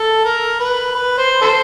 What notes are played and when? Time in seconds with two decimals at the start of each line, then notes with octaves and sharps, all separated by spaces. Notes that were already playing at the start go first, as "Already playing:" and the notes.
Already playing: A4
0.25 A#4
0.60 B4
0.95 B4
1.18 C5
1.42 A4 C5